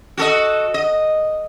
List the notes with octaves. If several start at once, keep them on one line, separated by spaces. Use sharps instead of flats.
F#4 A4 D#5
D#5